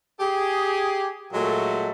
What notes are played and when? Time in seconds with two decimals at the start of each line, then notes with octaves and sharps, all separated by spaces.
0.20 G4 G#4
1.32 A#2 F#3 G#3 A3